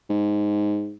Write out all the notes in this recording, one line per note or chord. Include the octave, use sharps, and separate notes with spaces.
G#2